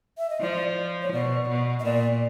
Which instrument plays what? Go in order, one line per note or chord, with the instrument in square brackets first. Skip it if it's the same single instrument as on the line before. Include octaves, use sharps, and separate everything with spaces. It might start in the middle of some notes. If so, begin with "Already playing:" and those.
[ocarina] E5
D#5
[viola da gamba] F3 [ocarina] D5
[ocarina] C#5
[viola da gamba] B2 [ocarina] D5
[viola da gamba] B2
[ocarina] D#5
[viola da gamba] A#2 [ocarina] D5